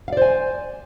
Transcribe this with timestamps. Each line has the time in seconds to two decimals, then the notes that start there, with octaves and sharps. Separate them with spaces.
0.08 F5
0.13 D5
0.17 C5
0.22 G#5